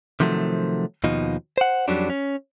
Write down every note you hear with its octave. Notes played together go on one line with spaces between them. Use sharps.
C3 D#3 F3 F#3 A3
D#2 B2 F3 D#4
C5 F#5
F2 F#3 G3 C#4 D4
C#4